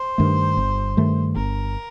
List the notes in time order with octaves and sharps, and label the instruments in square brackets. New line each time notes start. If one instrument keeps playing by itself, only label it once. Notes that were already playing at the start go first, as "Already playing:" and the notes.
Already playing: [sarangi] C5
[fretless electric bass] G2 D#3 A3
G1
G2 D#3 A3
[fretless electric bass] G1 [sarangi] A#4